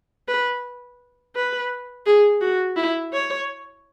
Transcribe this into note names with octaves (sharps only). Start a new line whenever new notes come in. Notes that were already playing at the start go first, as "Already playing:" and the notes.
B4
B4
G#4
F#4
E4
C#5